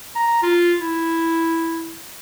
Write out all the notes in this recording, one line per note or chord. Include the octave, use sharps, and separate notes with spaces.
A#5
F4
E4